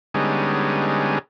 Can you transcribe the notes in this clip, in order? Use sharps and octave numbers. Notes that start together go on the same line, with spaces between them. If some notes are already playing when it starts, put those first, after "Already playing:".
D3 G3 G#3 B3 C#4 D#4